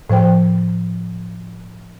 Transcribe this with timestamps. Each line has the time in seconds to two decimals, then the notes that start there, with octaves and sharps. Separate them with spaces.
0.10 A2 F3 C5 G5